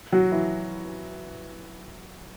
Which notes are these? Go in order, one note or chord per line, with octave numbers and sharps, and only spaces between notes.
F#3 F#4
E3 E4